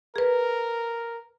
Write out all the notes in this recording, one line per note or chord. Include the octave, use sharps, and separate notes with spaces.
G#4 A#4 B4